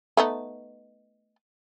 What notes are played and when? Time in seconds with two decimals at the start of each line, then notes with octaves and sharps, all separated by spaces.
0.17 A3 B3 D#4